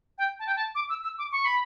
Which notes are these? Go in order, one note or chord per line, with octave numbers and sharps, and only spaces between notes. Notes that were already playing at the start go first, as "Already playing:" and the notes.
G5
A5
G5
A5
D6
E6
E6
D6
C#6
B5